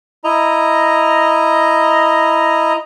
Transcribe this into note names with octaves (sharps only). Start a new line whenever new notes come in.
E4 D#5 A#5